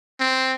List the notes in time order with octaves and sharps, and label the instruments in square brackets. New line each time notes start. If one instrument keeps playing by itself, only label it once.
[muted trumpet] C4